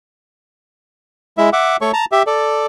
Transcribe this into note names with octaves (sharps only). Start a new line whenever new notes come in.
G#3 E4 E5
E5 F#5 D6
A3 A4 C#5 C#6
A5 A#5
G4 E5
A4 D5